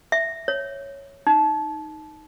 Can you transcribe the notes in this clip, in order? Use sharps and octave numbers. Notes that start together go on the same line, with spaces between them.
E5
C#5
D#4